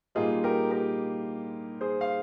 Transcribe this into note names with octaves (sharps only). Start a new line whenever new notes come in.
A#2 G3 A#3 D#4 F4 G#4
G4 A#4
G4 A#4
G#4 C5
F5